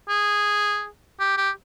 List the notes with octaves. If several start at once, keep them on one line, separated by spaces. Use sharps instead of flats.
G#4
G4
G4